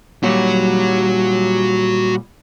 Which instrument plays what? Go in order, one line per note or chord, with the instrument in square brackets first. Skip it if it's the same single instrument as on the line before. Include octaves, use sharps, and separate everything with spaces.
[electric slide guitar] A#2 G3 [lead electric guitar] F#4 C#5